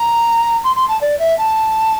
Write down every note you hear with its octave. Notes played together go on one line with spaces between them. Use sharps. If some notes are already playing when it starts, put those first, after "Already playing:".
Already playing: A#5
C6
C6
A5
D5
E5
A5